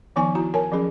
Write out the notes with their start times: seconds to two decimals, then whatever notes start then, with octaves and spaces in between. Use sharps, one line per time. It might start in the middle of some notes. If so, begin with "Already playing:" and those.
0.16 D#3 F3 B3 D#4 G#5 C#6
0.35 E4 F#4 A#5
0.54 A#4 C#5 G#5 A5
0.72 F3 F#3 C#4 G#4